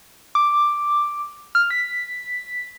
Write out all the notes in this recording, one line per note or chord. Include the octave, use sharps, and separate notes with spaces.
D6
F6
B6